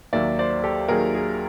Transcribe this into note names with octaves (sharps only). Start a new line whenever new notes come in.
D#2 D#3 F#3 A#3 D5 E5
C5 D5
G4 A4
D#2 D#3 F#3 A#3 G#4 A#4
G#4